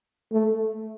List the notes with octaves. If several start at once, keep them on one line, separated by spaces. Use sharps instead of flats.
A3